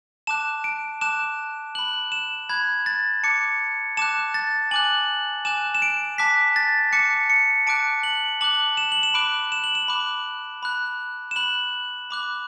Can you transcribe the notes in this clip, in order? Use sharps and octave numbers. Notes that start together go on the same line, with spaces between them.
A5 D6 F#6 E7
D7
A5 D6 F#6 E7
B5 F#6 F#7
E7
B5 F#6 G#6
A6
A5 D6 F#6 C#7
A5 D6 F#6 E7
A6
G#5 D6 F#6 F#7
G#5 D6 F#6 E7
E7
D7
A5 D6 F#6 B6
A6
A5 D6 F#6 C#7
C#7
A5 D6 F#6 D7
F#7
A5 D6 F#6 F#7
E7
F#7
E7
B5 D6 F#6 D7
E7
F#7
E7
B5 D6 F#6
B5 F#6
E7
B5 F#6 F#7
B5 D6 F#6